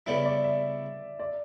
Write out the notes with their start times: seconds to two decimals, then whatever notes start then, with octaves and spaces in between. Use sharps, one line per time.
0.06 C#3 G3 B3 E4 E5
0.25 D5
0.44 E5
1.19 D5